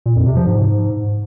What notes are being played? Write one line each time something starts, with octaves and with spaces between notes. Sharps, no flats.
A#2
F2
C3
F3
G#2